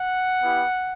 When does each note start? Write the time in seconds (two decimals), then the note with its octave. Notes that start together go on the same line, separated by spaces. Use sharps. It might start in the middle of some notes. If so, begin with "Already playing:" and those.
Already playing: F#5
0.41 B3 E4 G4